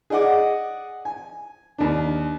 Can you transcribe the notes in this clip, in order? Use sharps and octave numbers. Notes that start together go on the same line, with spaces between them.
G#4 D5 D#5 F#5 D6
G#5
D#2 D4